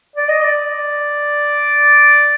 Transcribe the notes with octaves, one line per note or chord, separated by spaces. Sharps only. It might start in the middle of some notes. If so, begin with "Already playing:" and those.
D5
D#5
D5